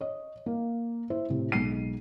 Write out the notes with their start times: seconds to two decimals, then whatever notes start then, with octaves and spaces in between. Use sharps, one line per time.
0.01 C#5 D#5
0.46 A#3
1.10 E4 C5 E5
1.30 A2 C3
1.52 B1 G#3 C7 D#7